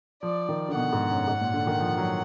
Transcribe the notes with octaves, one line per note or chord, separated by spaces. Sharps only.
F3 D5
D#3
D3
B2 F#5
G#2
F#2
G#2
A#2
D3
D#3
F3
F#3